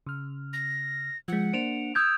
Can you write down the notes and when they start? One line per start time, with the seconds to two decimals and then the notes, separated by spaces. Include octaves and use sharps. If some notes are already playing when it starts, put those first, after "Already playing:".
0.06 C#3 F6
0.53 A#6
1.28 F3 G#3 F#5
1.53 A#3 D4 C5 D7 E7 F7
1.95 D#6 E6 G6 G#6